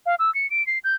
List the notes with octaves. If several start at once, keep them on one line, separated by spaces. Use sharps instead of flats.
F5
E6
C#7
D7
C7
G6